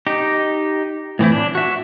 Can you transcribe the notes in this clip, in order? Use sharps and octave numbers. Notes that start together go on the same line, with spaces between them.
D#4 G4
A2 E3 C4 E4
D4
F#4 E5